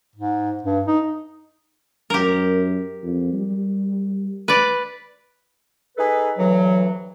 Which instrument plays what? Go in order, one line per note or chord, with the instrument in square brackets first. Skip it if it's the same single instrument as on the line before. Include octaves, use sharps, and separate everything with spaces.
[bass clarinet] G#2
G2
D#4
[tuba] F#2 [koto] G4 A#4
[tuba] F2
G3
[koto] B4 D5
[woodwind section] D#4 G#4 A4 B4
D2 G2 E3 F#3